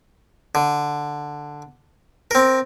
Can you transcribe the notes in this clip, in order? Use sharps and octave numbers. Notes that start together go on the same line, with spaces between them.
D3
C4 A#4